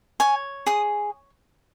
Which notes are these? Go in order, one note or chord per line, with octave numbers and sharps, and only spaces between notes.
C#5 G#5
G#4 D#6